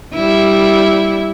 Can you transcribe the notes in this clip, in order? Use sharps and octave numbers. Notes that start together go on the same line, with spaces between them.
G3 E4